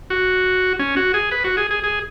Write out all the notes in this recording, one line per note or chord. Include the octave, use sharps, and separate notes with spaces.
F#4
C#4
F#4
G#4
B4
F#4
G#4
G#4
G#4